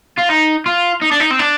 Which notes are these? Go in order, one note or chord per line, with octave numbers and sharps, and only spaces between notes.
F4
D#4
F4
D#4
D4
D#4
C4
D4